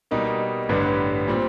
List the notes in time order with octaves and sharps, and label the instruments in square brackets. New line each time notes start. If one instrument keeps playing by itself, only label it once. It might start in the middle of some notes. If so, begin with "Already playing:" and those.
[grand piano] B2 G3 A#3 D#4
A1 G2 D3 G3 B3
A#2 G3 C4